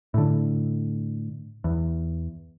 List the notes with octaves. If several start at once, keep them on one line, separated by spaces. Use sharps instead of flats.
A2 D3
E2